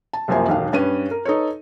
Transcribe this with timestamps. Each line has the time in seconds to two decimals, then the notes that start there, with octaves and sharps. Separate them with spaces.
0.13 A5
0.28 C2 F#2 F3 A#3 C5 G#5
0.48 E1 B1 D#3 F5
0.73 G2 C#4 B4 D#7
1.11 A#4
1.25 D#4 A4 B4 C#5